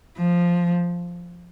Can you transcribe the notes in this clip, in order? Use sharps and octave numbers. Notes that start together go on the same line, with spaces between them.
F3